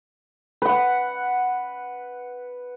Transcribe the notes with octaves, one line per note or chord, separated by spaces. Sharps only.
B4 F#5